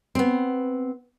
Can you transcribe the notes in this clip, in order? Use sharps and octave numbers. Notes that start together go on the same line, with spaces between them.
B3 C4